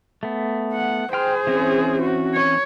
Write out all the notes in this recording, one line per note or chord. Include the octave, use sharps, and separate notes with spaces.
A3 B3
F#5
G#4 C5 G5 C6 F6
E3 C4 C#4
F#4
C#5